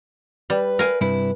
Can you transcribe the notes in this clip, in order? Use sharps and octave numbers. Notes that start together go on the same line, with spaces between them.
G3 B4
A#4 F5 G#5
G2 C3 E4 B4